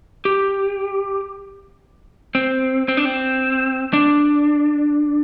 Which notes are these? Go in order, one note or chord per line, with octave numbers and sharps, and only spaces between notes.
G4
C4
C4
D4
C4
D4